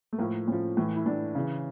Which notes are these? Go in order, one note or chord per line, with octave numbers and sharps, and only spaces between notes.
A3
A2 F3 A#3
A2 F3 C#4
A2 E3
E4
A2 E3 D4
C#3 E3